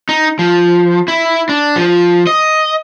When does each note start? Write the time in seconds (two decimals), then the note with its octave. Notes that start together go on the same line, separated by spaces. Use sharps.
0.09 D#4
0.39 F3
1.08 E4
1.49 D4
1.76 F3
2.27 D#5